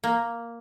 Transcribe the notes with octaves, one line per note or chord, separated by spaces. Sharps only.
A#3